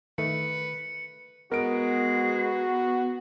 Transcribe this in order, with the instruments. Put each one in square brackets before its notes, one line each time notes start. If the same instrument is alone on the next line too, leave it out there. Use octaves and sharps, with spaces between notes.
[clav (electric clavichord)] D#3 A3 [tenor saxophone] B4 [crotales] C#7
[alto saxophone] G#3 [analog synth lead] B3 [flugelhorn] F#4 [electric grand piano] A#4 D7